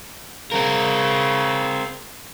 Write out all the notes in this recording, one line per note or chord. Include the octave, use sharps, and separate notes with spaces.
C#3 C4 A#4